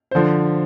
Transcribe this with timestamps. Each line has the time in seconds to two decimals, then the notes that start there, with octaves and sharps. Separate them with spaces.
0.11 C5
0.15 D3 F3